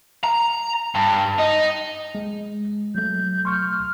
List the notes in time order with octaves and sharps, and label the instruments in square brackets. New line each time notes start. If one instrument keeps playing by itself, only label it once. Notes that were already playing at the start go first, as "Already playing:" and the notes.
[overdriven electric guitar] A#5
G2
D#4
[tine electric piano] G#3
[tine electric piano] F#3 A3 [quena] G6
[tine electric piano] C6 C#6 G6 [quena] F6